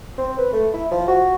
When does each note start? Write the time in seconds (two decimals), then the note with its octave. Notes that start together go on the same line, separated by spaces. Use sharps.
0.18 C4
0.38 B4
0.53 A3
0.74 E4
0.92 F3
1.08 F#4